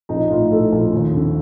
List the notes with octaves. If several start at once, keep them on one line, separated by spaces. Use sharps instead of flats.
A#1 D#4
A2 F4
A2 A4
A#1
D#2
D3